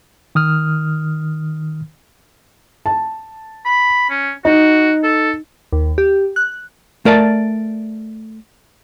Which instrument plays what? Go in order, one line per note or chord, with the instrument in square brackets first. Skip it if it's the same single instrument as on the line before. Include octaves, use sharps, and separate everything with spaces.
[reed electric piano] D#3 D#6 F6
[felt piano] A5
[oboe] B5
C#4
[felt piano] D#4 [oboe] F#4
[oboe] A4
[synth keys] D#2
G4
F#6
[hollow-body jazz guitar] A3 A#4 D5 A5